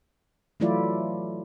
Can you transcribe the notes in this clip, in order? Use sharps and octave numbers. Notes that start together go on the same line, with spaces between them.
E3 F#3 A3 E4 F4 D5